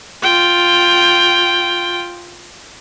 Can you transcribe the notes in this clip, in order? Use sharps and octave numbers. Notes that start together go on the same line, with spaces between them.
F4 G5